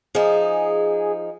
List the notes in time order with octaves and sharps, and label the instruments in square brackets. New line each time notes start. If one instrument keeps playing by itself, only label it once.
[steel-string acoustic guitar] F3 D#4 [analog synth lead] G#4